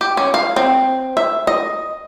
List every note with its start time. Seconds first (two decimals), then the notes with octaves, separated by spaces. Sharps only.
0.01 G4
0.17 C#4
0.34 F5
0.56 C4
1.17 E5
1.47 D#5